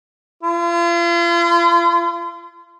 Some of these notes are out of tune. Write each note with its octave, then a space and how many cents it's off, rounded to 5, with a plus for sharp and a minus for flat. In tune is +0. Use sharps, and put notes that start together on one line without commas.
F4 -40